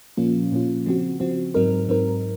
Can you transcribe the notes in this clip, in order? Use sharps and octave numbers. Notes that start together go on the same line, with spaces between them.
A#2 F3 A#3 C#4 F4
A#2 F3 A#3 C#4 F4
C#3 F3 C4 F#4
C#3 F3 C4 F#4
G#2 F#3 C4 D#4 A#4
G#2 F#3 C4 D#4 A#4